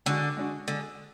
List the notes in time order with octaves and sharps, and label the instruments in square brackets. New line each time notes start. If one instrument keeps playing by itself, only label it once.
[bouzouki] D3 [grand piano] G#3 D4 F#4
[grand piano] G#3 D4 F#4
[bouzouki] D3 [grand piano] G#3